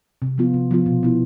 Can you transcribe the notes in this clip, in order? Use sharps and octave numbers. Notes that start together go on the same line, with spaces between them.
C3
F3 B3 F4
C3
F3 B3 F4
B2
B3 E4